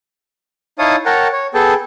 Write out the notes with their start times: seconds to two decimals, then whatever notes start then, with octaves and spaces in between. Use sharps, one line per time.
0.79 D#4 E4 C#5 F5 A5 D#6
1.06 A#4 C#5 F#5 G5 A5 A#5
1.33 C#5
1.54 B3 G#4 A4 G5 A5